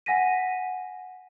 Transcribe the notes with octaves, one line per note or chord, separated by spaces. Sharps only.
F#5 G#5 A#6 B6 D#7